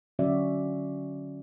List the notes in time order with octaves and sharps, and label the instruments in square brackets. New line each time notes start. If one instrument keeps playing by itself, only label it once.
[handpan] D3 F#3 C#4 F#4 D5 E5